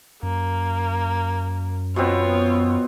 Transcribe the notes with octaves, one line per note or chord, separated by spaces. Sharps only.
F#2 A#3
B2 B3 C4 F4 C#5